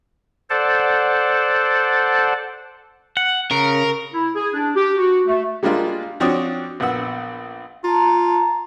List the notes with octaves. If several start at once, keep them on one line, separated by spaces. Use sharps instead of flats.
A4 C5 D5 F#5 A5
F#5
C#3 A#4
E4
G#4
D4
G4
F#4
A3
G3 G#3 A#3 D4 F4
F3 C4 D4 F#4 C#5 D#6
A#1 B3 F#5 E6
F4 A5 A#5